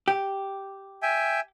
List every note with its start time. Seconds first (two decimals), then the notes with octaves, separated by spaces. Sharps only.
0.08 G4
1.02 E5 G5 G#5